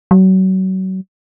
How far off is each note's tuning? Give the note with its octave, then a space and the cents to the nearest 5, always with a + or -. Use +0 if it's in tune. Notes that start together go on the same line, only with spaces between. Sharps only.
F#3 +30